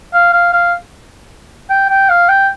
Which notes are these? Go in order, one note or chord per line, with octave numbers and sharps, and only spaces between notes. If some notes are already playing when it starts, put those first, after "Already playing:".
F5
F5
F5
G5
G5
F5
G5